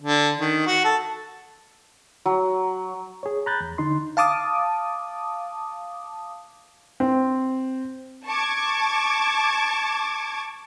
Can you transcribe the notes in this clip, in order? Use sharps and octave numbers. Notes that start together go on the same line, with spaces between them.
D3
D#3
F#4
A4
F#3
G#4 C#5
A#5 B5 F#6 G6 A6
E2
D3 D#4 C6
F5 A5 D6 D#6
C4
A5 C#6 D6 G#6